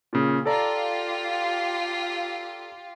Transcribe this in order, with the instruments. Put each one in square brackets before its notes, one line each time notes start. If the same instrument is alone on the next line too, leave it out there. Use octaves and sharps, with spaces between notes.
[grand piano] A#2 C#3
[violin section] F4 G4 [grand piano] A4 D5 A#5